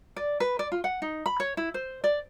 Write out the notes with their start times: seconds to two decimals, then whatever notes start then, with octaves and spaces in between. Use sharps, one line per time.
0.16 D5
0.40 B4
0.59 D5
0.72 F4
0.84 F#5
1.02 D#4
1.26 B5
1.40 C#5
1.57 E4
1.74 C5
2.04 D5